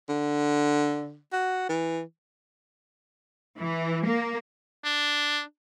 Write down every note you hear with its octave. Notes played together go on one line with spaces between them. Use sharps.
D3
F#4
E3
E3
A#3
D4